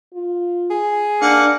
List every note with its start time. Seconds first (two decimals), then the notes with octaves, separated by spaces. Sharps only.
0.14 F4
0.70 G#4
1.22 A#3 D4 F#5